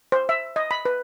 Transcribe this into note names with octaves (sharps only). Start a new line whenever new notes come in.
C5
E5
D#5
B5
B4